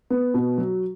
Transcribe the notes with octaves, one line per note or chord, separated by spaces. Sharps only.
B3
B2
F#3